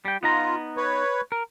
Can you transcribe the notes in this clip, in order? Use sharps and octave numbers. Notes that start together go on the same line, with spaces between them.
G3 G5
B3 D#4 F4 A#5
B4 C#5
A#4